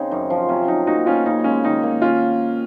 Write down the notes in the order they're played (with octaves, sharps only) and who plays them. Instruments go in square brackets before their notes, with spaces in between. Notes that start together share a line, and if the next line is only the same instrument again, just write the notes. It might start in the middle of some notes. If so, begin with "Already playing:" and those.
Already playing: [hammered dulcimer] C#3 C4 [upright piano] D#4
[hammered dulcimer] F#2 [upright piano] D#4
[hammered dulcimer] F3
[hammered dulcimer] C3 [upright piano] C#4
[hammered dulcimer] F#3 [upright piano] D#4
[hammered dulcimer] A#2 [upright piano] D#4 F#4
[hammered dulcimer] A#3 [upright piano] C#4 F4
[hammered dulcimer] C#3 [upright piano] D#4
[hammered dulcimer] G#3 [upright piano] C#4
[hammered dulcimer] D#3 [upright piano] D#4
[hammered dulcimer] A#3
[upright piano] C#4 F4